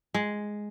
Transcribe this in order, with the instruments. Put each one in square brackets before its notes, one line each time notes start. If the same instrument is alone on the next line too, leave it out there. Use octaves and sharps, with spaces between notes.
[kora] G#3